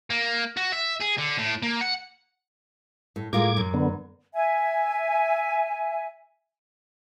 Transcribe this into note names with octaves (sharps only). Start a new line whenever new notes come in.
A#3
F#4
E5
G#4
D3
A2
A#3
F#5
A2
A2 G#3 F4 A#4 D6 G#6
F#2
D3 B3
E5 G#5